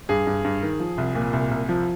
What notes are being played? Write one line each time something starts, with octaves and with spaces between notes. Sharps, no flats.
G2 G#4
G2
G2
D#3
F3
C2
A#2
C2
C2
F3